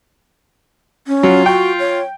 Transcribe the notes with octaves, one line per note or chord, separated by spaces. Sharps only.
C#4
F#3 F4
F#4 G5
C#5